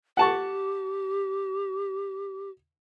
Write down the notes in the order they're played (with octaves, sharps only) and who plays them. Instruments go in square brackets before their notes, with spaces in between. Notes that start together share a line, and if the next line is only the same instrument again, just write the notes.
[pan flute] G4 [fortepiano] F#5 A5 C#6